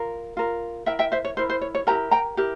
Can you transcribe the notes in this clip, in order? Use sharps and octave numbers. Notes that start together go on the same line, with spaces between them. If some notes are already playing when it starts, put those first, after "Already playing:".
Already playing: F4 A#4
F4 A#4
E4 A#4 E5 G5
E5 G5
C5 E5
C#5
E4 A#4 C5
C5
C#5
C#5
E4 G4 A#4 G5 A#5
G5 A#5
E4 G4 A#4